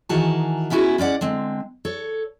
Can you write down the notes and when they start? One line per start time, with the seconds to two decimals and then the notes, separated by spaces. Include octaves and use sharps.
0.09 D#3 E3 F#4 G#4 A#4 A5
0.70 B3 C#4 E4 F#4 G#4
0.98 G#3 C#4 D5 F#5
1.21 D3 G#3 C4
1.85 A4 C#5